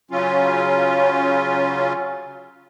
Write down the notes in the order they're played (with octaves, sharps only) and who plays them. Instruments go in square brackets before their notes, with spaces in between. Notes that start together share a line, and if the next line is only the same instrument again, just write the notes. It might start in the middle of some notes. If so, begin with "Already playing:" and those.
[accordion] C#3 F#3 C#4 F4